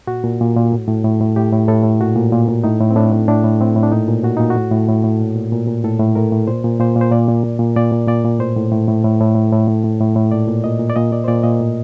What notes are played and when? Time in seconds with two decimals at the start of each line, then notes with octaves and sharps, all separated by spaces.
0.07 A#2 F#4
0.24 A#2
0.41 A#2
0.57 A#2
0.72 A2
0.88 A2
1.04 A2
1.20 A2
1.36 A2 G4
1.52 A2
1.68 A2 A4
1.83 A2
2.00 A#2 F#4
2.16 A#2
2.32 A#2
2.48 A#2
2.64 A2 D#4
2.81 A2
2.91 C4
2.96 A2 D4
3.12 A2
3.27 A2 D4
3.44 A2
3.60 A2 C4
3.76 A2
3.83 D4
3.92 A#2 D#4
4.08 A#2
4.24 A#2 F#4
4.37 A#2 D#4
4.50 F#4
4.56 A2
4.71 A2
4.88 A2
5.04 A2
5.20 A#2
5.35 A#2
5.52 A#2
5.68 A#2
5.84 A2 A4
5.99 A2
6.15 A2 A#4
6.33 A2
6.47 A#2 C5
6.64 A#2
6.79 A#2 C5
6.96 A#2
7.01 C5
7.12 A#2 D5
7.28 A#2
7.44 A#2
7.59 A#2
7.76 A#2 D5
7.92 A#2
8.07 A#2 D5
8.24 A#2
8.40 A2 C5
8.56 A2
8.71 A2
8.88 A2
9.04 A2
9.21 A2
9.36 A2
9.52 A2
9.68 A2
9.84 A2
10.00 A2
10.16 A2
10.31 A#2 D5
10.48 A#2
10.64 A#2 D#5
10.80 A#2
10.90 D5
10.96 A#2 D#5
11.12 A#2 D5
11.24 C5
11.28 A#2 D5
11.43 A#2 D#5
11.60 A2